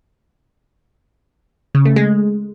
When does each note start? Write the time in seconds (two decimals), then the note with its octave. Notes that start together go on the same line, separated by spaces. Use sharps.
1.75 C#3
1.85 A3
1.96 G#3